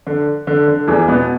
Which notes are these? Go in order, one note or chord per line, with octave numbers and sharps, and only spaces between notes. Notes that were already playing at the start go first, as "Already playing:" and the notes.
D3
D3
D3
E2 E3
B2 B3